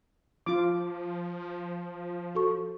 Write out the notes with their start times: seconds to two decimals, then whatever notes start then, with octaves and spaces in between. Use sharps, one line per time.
0.46 F3 F4 D6
2.35 F#4 A4 C#6